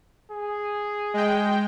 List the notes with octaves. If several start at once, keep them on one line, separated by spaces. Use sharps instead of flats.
G#4
G#3 G5